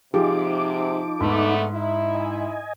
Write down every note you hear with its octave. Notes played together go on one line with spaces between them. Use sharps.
G#2 C3 F3 D#4 G4 G#4 D6
G#2 D3 A3 B3 B5
D#4 E4
D#5 G#5